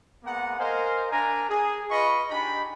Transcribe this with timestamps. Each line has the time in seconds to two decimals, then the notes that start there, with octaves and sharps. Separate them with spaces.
0.24 G#3 A#3 B3 F#5 A#5
0.59 A#4 C5 D#5 F5 G#5
1.11 D4 A#4 G#5 A#5
1.49 G#4
1.90 F4 B4 D#5 B5 C#6
2.30 D4 D#4 G4 G#5 B5